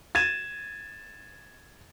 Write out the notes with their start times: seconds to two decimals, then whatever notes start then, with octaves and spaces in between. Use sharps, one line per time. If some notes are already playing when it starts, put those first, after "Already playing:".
0.15 G#6 A6 D#7 E7